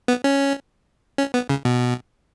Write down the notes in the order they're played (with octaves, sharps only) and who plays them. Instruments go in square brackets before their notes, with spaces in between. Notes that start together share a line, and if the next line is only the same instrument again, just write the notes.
[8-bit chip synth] B3
C#4
C#4
B3
C#3
B2